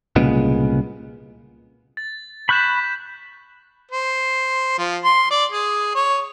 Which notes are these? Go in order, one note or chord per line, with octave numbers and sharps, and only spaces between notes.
C2 A#2 C#3 G#3 B3
A6
B5 C#6 F#6 G6 B6 E7
C5
F3
C6
D5
G#4
C#5